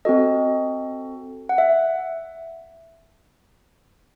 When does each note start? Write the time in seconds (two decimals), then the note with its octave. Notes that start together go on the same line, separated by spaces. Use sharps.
0.05 C4 F#4 A4 D#5
1.49 F#5
1.58 E5